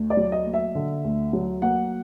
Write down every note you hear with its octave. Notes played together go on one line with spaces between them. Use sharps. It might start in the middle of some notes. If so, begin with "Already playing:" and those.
Already playing: D2
D5
F#3
D#5
A#3
E5
D3
D2
F#3
A#3 F#5